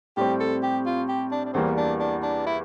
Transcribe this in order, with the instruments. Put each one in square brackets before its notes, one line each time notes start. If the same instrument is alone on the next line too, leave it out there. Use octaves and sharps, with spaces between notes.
[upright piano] A2 G3 C4 [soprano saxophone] G4
[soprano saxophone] A4
G4
F4
G4
D4
D4
[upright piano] E2 E3 G3 A#3 [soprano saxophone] C4
[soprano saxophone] D4
D4
D4
E4